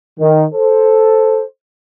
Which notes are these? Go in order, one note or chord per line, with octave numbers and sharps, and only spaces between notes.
D#3
A4 C5